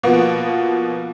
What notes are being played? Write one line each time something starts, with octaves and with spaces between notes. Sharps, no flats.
B2 F3 A#3 B3